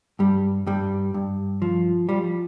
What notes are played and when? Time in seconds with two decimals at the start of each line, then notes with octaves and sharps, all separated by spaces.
0.19 G2 G3
0.67 G2 G3
1.14 G2
1.62 F3
2.09 F3 G3